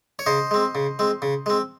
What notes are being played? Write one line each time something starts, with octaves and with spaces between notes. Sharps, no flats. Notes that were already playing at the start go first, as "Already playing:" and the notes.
C#5
C#3 C5 D#5
G#3 C4
C#3
G#3 C4
C#3
G#3 C4